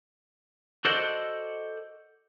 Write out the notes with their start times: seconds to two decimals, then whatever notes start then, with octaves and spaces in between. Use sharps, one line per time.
0.85 F#4 A4 C5 D5 D#5 F#5